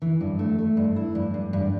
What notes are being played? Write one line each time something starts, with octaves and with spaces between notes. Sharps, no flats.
E3
G2
A3
A3
G2
E4
G2
G2
G2